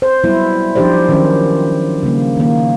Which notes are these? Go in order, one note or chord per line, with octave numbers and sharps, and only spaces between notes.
C5
F#3 G3 B3 E4
F3 D4 D#4 G4 C5 D5
D#3 F#3 C#4 C5
C#3 G3 A#3
D#3 A#3